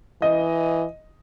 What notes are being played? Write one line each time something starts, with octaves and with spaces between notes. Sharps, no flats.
E3 D#5